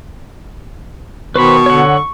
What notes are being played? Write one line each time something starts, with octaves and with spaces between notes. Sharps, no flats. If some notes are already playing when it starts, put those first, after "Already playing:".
B2 D#3 B4 C5 B5 C#6
D3 C#5 F#5